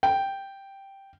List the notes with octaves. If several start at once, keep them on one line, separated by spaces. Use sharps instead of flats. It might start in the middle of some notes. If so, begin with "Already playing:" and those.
G5